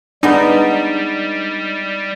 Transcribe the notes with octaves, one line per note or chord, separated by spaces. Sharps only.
G3 G#3 B3 D4 D#4